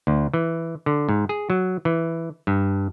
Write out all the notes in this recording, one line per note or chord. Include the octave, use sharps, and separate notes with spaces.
D2
E3
D3
G#2
G#4
F#3
E3
G2